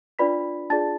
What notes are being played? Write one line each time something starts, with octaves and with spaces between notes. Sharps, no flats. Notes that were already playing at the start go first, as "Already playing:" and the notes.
D4 F4 B4 D5 B5 B6
D4 F4 G#4 D5 A5 A6